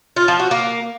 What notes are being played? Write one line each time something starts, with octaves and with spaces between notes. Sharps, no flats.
F4
F3
F#4
A#3